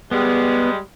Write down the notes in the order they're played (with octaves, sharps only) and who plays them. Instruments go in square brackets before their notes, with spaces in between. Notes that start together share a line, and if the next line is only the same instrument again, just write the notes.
[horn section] G3 G#3 [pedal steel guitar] B3